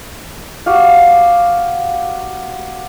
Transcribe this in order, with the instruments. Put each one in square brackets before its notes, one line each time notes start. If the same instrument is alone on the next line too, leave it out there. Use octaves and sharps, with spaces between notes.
[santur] F#4 G4 F5